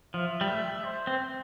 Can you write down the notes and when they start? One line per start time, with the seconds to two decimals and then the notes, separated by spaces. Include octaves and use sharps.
0.14 F3 E5
0.41 G3
0.49 A3
0.84 C5
1.07 C4